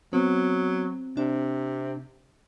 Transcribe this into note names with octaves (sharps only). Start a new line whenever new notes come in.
F#3 B3 C4
C3 D4